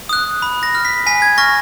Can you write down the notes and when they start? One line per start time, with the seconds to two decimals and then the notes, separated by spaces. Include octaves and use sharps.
0.09 D#6 F#6
0.42 B5
0.63 A#6
0.75 F6
0.85 B6
1.06 G#5 B6
1.22 G#6
1.38 C#6 F6 A#6